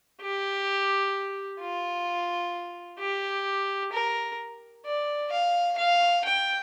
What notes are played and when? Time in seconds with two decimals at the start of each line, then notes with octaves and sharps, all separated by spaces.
0.22 G4
1.61 F4
3.00 G4
3.93 A#4
4.86 D5
5.32 F5
5.78 F5
6.25 G5